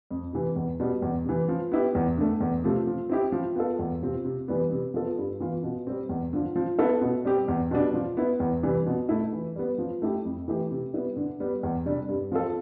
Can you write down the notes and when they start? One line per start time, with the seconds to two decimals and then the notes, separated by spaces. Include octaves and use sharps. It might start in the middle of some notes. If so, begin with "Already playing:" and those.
0.11 F2
0.33 C3 E3
0.56 E2
0.80 B2 G3
1.02 E2
1.25 C3 E3
1.48 F3
1.71 B3 E4 G4
1.95 E2
2.17 D3 A3
2.41 E2
2.64 C3 F3 A3
2.87 F3
3.10 C4 E4 G4
3.32 F3
3.55 B3 F4 A4
3.79 E2
4.02 C3 F3 C4
4.25 C3
4.48 E3 G3 B3
4.71 C3
4.94 F3 B3 F4 A4
5.18 G2
5.40 E3 B3 F4
5.63 B2
5.87 G3 C4
6.09 E2
6.33 D3 F3
6.56 F3
6.79 B3 E4 A4
7.01 B2
7.25 G3 C4 G4
7.48 E2
7.71 B2 G3 D4
7.94 F3
8.17 B3 E4
8.40 E2
8.63 C3 E3 G3
8.86 B2
9.09 A3 E4
9.33 E3
9.56 G3 B3
9.78 F3
10.02 A3 E4 G4
10.25 F2
10.48 E3 A3 E4 G4
10.71 C3
10.94 G3 B3 E4
11.16 D3
11.40 G3 B3
11.63 E2
11.85 C3 G3 D4
12.09 G2
12.32 F3 C4 F4 A4